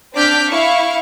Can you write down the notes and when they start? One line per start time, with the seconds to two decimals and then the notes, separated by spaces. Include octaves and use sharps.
0.13 C4 D4 D6 F6 G6 B6
0.50 E4 E5 F5 C#6